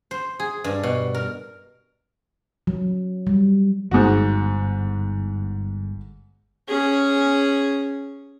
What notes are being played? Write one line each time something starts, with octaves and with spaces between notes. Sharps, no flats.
C5
G#4
G2
B2
A#4
F#3
G3
G1 G#2 F#4
C#4 G#4